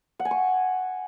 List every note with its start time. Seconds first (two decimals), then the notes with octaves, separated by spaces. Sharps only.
0.20 F#5
0.25 G#5
0.31 C#6